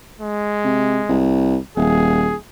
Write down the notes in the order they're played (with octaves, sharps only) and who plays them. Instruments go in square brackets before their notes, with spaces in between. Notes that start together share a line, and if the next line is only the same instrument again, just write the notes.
[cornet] G#3
[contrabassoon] C3
C2
[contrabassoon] D#1 [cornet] G#4